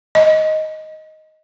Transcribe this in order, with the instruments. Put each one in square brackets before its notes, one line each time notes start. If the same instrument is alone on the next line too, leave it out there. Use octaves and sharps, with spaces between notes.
[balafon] D#5